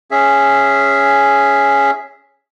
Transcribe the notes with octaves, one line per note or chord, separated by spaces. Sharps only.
C#4 G#4 E5